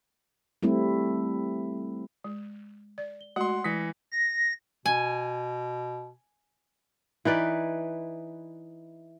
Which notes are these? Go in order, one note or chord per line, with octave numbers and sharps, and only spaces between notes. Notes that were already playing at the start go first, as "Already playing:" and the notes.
G3 A3 C4 E4
G#3
D5
G7
G#3 A3 F#4 F#5 C6
E3 G#3 A#6 B6 C#7
A#6
B2 G#5
E3 D#4 B4 D5